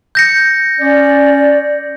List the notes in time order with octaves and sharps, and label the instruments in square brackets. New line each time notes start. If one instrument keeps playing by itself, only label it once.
[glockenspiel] G6 A#6 C#7
[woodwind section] C#4 D5